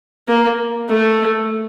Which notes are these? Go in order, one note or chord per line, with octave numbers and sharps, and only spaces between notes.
A#3
A3